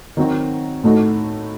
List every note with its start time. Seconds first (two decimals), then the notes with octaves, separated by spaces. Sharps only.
0.17 D#3 F#3 C4 F#4
0.83 A2 A3 D#4 F#4